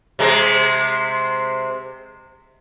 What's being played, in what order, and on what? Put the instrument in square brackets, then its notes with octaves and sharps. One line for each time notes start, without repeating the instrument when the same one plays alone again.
[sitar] C3 G#3 C4